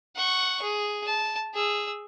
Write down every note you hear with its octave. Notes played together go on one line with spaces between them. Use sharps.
F#5 C#6
G#4
A5
G#4 E6